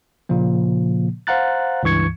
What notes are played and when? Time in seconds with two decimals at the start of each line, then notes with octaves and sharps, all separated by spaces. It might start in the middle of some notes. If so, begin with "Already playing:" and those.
0.29 A#2 C#3 F3 A#3
1.27 C5 F5 F#5 A#5 F#6 A6
1.83 C#2 G2 E3 C#6 G#6 C#7